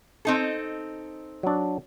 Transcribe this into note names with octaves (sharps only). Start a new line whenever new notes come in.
C4 D#4 A4
F#3 D4